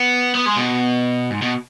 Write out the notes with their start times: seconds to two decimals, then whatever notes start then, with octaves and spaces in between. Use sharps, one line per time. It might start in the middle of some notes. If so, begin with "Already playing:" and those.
Already playing: B3
0.35 B3
0.46 G#3
0.56 B2
1.30 G#2
1.42 B2